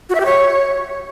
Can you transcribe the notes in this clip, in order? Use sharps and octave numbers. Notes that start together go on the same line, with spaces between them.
F#4
E5
G4
C#5